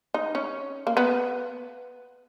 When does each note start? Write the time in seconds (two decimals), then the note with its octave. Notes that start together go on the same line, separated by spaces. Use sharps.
0.14 D#4
0.35 C#4
0.87 A#3
0.97 B3